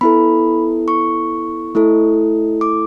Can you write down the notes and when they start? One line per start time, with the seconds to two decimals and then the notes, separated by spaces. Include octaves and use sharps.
0.01 B3 E4 A4 B5
0.88 C#6
1.75 A3 E4 A4
2.61 D6